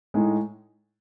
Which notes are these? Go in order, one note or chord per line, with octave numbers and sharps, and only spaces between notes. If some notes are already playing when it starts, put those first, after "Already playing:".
A2 G#3 D#4